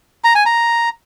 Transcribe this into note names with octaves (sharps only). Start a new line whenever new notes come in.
A#5
G#5
A#5